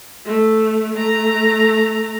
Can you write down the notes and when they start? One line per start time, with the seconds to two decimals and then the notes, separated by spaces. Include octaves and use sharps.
0.25 A3
0.94 A3 A#5